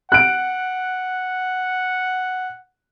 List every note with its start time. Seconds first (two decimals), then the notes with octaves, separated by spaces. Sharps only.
0.12 F#5 F#6 D7